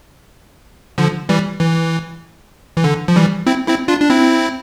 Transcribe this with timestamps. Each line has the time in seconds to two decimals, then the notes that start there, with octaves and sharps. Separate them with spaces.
0.98 D3 F3
1.29 E3 G3
1.60 E3
2.77 E3
2.84 D3
3.08 F3
3.16 E3 G3
3.47 C4 E4
3.68 C4 E4
3.88 D4 F4
4.00 D4
4.10 C4 E4